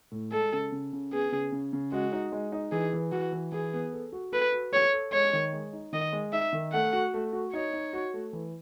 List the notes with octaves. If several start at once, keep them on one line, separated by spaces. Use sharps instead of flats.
A2
G#3 A4
C#3
C#3
C#3
B3 G#4
C#3
C#3
C#3
G#3 F#4
D#4
G#3
D#4
E3 G#4
E3
E3 F#4
E3
E3 G#4
B3
A4
F#4
A4 B4
F#4
A4 C#5
A4
G#3 C#5
D#3
G#3
D#4
D#3 D#5
G#3
D#4 E5
D#3
A3 F#5
F#4
A3
F#4
D#4 C#5
D#4
F#4
A3
E3